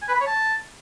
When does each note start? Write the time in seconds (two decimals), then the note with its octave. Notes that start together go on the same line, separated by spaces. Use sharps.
0.02 G#5
0.08 B4
0.14 B5
0.20 C#5
0.27 A5